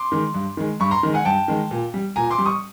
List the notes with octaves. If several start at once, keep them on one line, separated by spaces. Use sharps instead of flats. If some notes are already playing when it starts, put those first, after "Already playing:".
Already playing: C6 D6
D#3 G#3
G2
D#3 G#3
G2 B5 C#6
A#5 C6
D#3 G#3
F#5 G#5
G2 G5 A5
D#3 G#3
A#2
G3
A#2 G#5 A#5
C6 D6
G3
C#6 D#6